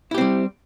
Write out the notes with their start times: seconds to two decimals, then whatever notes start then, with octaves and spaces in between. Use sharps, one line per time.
0.11 E4
0.14 G4
0.18 C4
0.21 G3